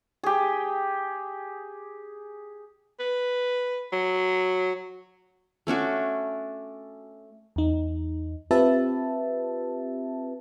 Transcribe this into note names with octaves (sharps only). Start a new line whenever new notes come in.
G4 G#4
B4
F#3
A3 C#4 D4 F#4
E2 D#4
C4 F4 G4 B4 E5 A5